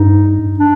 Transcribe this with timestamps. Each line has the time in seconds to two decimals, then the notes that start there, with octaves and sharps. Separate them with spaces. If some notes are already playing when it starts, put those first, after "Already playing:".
Already playing: G2 D#4
0.59 D4